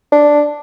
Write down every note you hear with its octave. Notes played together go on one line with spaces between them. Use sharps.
D4